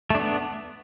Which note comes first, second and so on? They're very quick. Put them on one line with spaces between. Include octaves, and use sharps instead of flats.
A3 D4 B3